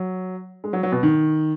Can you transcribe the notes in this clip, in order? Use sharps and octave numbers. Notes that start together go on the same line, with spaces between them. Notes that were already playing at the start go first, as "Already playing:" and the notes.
Already playing: F#3
G#3
F#3
F#3
B2
D#3